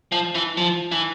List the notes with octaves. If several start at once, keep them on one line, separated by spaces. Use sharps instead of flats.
F3
E3
F3
E3